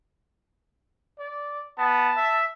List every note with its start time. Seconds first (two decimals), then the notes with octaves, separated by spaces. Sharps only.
1.19 D5
1.78 B3 A5
2.17 E5